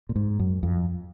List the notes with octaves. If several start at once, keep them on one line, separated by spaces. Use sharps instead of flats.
A#2
G#2
F#2
F2